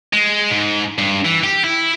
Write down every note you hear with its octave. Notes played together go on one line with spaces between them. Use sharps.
G#3
G#2
G2
E3
G4
E4